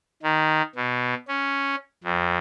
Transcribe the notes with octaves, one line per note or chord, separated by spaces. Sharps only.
D#3
B2
C#4
F2